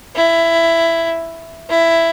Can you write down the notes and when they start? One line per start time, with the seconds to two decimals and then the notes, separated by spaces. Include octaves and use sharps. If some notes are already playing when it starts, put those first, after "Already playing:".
0.15 E4
1.69 E4